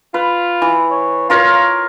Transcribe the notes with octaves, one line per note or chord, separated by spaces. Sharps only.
F4 B4
E3
C#5
F4 A#4 C#5 F5